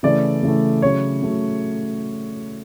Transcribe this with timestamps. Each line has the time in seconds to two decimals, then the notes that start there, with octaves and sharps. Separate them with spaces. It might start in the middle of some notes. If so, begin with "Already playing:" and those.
0.03 C#3 E3 A3 D5
0.43 C#3 E3 A3
0.82 C#3 F#3 A3 C#5
1.22 C#3 F#3 A3